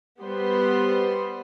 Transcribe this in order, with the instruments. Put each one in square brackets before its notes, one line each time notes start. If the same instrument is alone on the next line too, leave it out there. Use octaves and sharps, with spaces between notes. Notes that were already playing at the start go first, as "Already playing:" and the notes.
[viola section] G3 B3 G4 B4 C5 C6